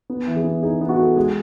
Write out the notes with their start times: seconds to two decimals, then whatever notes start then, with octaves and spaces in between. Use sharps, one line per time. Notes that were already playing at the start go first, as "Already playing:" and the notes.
0.10 B3
0.27 E3
0.36 G#4
0.44 B3
0.63 D#4 G#4
0.81 B3
0.89 F#4
0.99 A4
1.16 G#3 G#4